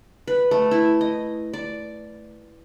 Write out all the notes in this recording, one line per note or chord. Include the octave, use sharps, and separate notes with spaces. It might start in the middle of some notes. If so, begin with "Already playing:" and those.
B4
A3
E4
D#5
D5